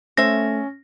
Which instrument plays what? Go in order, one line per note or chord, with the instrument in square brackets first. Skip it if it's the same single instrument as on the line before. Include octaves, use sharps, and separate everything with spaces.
[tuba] A3 [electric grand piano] C#4 [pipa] C5 E5 [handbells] A#6